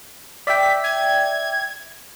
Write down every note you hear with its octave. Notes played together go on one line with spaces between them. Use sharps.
D5 E5 G5 B6
G#6